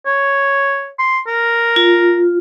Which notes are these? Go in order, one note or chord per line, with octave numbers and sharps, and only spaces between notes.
C#5
C6
A#4
F4